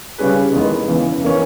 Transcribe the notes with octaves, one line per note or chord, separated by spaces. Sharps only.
C#3 G3 C#4 G#4 B4
E2 D#3 G#3 B3
E2 C#3 E3
E3 A#3 C#4